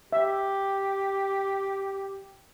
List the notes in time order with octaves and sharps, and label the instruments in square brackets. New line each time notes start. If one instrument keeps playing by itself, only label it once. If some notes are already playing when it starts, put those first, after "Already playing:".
[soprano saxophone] G4 [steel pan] E5